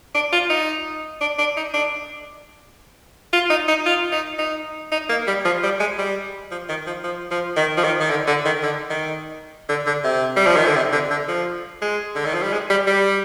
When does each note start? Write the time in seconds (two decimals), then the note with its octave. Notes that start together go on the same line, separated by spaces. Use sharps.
0.14 D4
0.33 F4
0.50 D#4
1.21 D4
1.39 D4
1.57 D#4
1.74 D4
3.33 F4
3.50 D#4
3.68 D#4
3.86 F4
4.12 D#4
4.39 D#4
4.92 D#4
5.09 A#3
5.27 G3
5.45 F3
5.63 G3
5.80 G#3
5.99 G3
6.51 F3
6.69 D#3
6.87 F3
7.04 F3
7.31 F3
7.57 D#3
7.77 F3
7.84 D#3
8.00 D#3
8.10 D3
8.27 D3
8.45 D#3
8.63 D3
8.90 D#3
9.69 D3
9.87 D3
10.04 C3
10.37 G3
10.47 F3
10.56 D#3
10.66 D3
10.76 C3
10.92 D3
11.11 D3
11.28 F3
11.82 G#3
12.15 D3
12.25 D#3
12.34 F3
12.42 G3
12.53 G#3
12.70 G3
12.87 G3